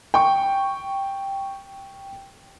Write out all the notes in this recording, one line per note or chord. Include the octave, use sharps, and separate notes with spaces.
G5 C#6